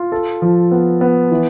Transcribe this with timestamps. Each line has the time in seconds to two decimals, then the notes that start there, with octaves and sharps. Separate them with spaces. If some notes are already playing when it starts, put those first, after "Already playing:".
Already playing: F4
0.12 A4
0.42 F3
0.71 B3
1.01 B3
1.31 E3